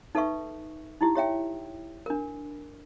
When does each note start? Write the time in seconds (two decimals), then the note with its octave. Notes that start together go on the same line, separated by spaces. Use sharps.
0.15 D#4 A4 B4 E5 C#6
1.01 D#4 E4 G4
1.15 G4 C#5 E5 G5
2.06 D4 A#4